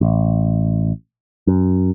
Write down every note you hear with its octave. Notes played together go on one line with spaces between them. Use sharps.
A1
F#2